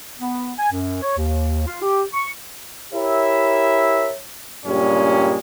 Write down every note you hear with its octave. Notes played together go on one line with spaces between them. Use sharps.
B3
G#5
F#2
C#5
D#2
F4
G4
C#6
E4 G4 A#4 C#5 E5
G2 A#2 C#3 G3 G#3 C#4